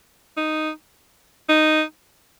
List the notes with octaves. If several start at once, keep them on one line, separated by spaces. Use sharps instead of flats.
D#4
D#4